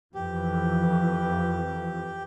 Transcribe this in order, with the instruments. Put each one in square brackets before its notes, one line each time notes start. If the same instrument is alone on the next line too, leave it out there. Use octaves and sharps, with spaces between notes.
[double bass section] F2 E3 F3 [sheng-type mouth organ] G4